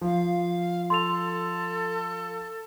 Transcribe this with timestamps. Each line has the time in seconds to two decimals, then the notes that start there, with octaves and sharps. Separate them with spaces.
0.01 F3 F5
0.90 A4 C6 F7